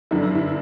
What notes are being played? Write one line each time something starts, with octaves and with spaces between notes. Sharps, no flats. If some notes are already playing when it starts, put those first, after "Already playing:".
G1 F#2 D3 E4
D4
E4